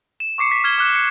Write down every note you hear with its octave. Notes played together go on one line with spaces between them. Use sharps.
E7
C#6 D6 C7 C#7
B6
F6 G#6 G7
D6 F#6 E7
C#7